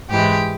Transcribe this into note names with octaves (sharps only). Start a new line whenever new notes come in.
G#2 E3 G#3 G4